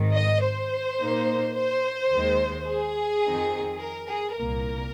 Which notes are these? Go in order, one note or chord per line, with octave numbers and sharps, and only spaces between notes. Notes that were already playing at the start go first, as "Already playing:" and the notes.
Already playing: G#1 G#2 D#3
D#5
C5
A#2 A#3 D#4
C5
D#2 D#3 G#3
G#4
F2 D#3 C4 D#4
A#4
G#4
C2 A#2 A#3 A#4